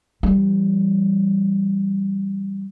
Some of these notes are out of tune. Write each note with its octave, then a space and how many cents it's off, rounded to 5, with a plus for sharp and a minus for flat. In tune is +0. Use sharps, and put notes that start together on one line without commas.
E3 +35 G3 +0